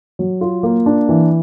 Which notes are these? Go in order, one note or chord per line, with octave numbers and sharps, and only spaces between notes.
F#3
F4
A#3
D4
E3